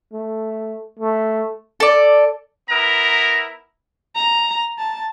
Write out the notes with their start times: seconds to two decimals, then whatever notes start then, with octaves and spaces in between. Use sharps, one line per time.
0.13 A3
0.99 A3
1.80 A4 D5
2.69 B3 E4 A#4 A#5
4.15 A#5
4.78 A5